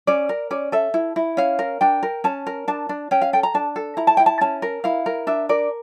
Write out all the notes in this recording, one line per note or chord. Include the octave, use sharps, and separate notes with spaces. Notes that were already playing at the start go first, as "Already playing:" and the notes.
C#4 D5
A#4
C#4 D5
A4 E5
E4
E4
C#4 F5
A#4
D4 G5
A#4
C#4 A5
A#4
D4 A5
D4
C#4 G5
F5
A4 G5
A#5
D4 A5
A4
E4 A#5
A5
E4 G5
A5
C#4 A5
A#4
E4 F5
A#4
D4 E5
A#4 D5